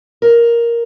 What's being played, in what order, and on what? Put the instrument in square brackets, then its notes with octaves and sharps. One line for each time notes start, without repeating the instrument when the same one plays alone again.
[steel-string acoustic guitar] A#4